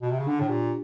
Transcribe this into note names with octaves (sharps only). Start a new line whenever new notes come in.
B2
C3
C#3
D3 D4
A2
A#2 G4